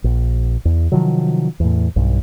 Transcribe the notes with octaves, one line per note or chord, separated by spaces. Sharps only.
A#1
E2
C3 D#3 F3 F#3
E2 A2
B1 G2